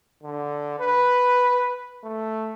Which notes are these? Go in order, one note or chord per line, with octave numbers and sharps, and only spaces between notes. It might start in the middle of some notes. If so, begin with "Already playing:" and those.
D3
B4
A3